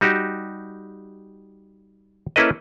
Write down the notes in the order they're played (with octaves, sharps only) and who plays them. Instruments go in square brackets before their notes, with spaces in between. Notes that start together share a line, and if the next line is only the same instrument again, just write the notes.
[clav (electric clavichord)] G3 D#4 F#4 G4
A#3 C#4 E4 A4 B4 D#5